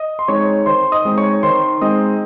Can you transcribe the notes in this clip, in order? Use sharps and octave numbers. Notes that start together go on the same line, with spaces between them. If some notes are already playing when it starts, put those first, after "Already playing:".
Already playing: D#5 D#6
C6
G#3 C4 D#4 C#5 C#6
D#3 C5 C6
D#5 D#6
G#3 C4 D#4
C#5 C#6
D#3 C5 C6
G#3 C4 D#4 D#5 D#6